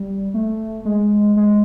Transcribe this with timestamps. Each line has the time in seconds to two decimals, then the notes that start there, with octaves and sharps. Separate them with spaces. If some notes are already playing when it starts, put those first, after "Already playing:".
Already playing: G3
0.34 A3
0.85 G#3
1.36 G#3